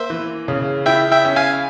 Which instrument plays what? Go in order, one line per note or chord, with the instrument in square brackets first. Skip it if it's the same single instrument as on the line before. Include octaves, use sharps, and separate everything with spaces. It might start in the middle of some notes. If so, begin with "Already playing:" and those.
Already playing: [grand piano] A#3 [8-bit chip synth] C5 E5
[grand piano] E3
C#3
[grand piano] E4 [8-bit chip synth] E5 G5
[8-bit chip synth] E5 G5
[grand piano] C#4
[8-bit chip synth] F5 G#5